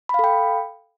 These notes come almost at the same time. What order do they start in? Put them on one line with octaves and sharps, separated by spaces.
B5 F5 A4 G5